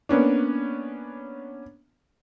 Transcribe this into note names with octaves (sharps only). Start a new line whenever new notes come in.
A#3 B3 C#4 D4